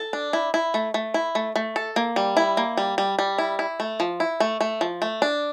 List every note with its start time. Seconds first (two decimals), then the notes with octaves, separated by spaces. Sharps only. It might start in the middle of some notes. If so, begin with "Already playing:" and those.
Already playing: A4
0.13 D4
0.33 E4
0.54 E4
0.74 A3
0.94 A3
1.14 E4
1.35 A3
1.56 A3
1.76 A4
1.96 A#3
2.16 G3
2.37 E4
2.57 A#3
2.77 G3
2.98 G3
3.19 G3
3.38 E4
3.59 E4
3.80 A3
4.00 F3
4.20 E4
4.40 A3
4.61 A3
4.81 F3
5.02 A3
5.22 D4